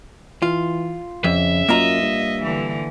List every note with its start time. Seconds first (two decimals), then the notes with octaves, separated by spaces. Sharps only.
0.42 E3 F4
1.24 F2 C#3 E5
1.69 F#2 A#3 F4 D#5 A#5
2.02 G2
2.43 D3 E3